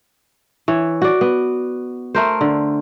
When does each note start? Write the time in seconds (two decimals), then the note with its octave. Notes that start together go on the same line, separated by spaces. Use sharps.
0.68 E3 C#5
1.02 F#4 D5
1.21 B3
2.15 A3 A#4 C5
2.41 D3